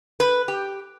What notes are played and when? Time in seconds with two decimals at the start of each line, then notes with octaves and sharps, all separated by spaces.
0.20 B4
0.48 G4